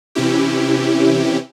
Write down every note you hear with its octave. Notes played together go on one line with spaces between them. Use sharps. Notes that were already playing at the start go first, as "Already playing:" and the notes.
C3 E3 C#4 E4 G4